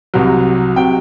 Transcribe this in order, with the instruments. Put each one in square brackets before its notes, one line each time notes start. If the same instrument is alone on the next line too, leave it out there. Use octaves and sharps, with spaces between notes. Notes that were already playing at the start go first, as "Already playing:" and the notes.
[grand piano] C2 C3 F#3
C3 F#3 G5